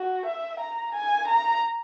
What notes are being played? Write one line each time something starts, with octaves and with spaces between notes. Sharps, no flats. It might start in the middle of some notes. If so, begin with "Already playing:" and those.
Already playing: F#4
E5
A#5
G#5
A#5